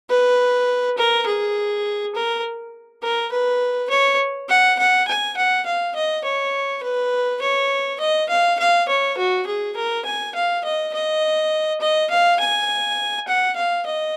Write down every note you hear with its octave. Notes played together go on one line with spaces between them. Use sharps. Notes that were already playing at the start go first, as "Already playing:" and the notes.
B4
A#4
G#4
A#4
A#4
B4
C#5
F#5
F#5
G#5
F#5
F5
D#5
C#5
B4
C#5
D#5
F5
F5
C#5
F#4
G#4
A#4
G#5
F5
D#5
D#5
D#5
F5
G#5
F#5
F5
D#5